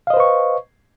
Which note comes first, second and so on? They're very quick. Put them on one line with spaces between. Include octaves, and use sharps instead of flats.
F5 D#5 C5 B4 C#6